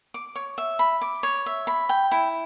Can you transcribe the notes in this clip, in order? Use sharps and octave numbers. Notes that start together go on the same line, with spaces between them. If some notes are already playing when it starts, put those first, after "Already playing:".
D6
C#5
E5
B5
D6
C#5
E5
B5
G5
E4